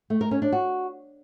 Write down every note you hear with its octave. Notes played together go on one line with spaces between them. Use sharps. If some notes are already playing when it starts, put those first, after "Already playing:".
A3
A#4
C#4
D4
F#4